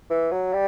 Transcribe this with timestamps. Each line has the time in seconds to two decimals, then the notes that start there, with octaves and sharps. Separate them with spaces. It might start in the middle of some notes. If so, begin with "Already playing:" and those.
0.10 E3
0.31 F#3
0.53 G3